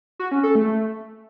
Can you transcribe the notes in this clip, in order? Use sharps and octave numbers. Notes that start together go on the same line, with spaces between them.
F#4
C#4
A4
A3